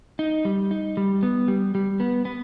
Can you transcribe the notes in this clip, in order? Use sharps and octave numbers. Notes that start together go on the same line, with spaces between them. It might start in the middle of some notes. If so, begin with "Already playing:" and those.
D#4
G3
D#4
G3
B3
G3
G3
B3
B3